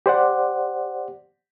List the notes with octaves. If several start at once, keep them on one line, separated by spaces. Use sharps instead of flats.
G4 C5 D5 F#5